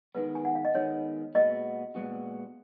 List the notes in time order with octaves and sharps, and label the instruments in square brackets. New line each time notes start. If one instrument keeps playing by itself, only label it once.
[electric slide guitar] D#3 G#3 B3 [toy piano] B4
[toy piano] G#5
F#5
F5
D#5
[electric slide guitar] D#3 G#3 B3 [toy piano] C#5
[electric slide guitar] A#2 G#3 B3 F#4 [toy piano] D#5
[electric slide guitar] A#2 G#3 B3 F#4